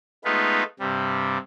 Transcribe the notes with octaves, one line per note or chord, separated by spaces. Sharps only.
G#3 A3 B3 D#4 F4 B4
G2 C3 G3